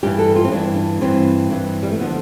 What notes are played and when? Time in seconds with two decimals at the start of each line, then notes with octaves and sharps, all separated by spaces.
0.03 G2 E3 G4
0.19 A4
0.36 F4
0.44 C4
0.51 G2 E3 D4
0.76 D4
1.01 G2 E3 C4
1.51 G2 E3
1.83 G3
1.91 A3
1.99 D3 F3 B3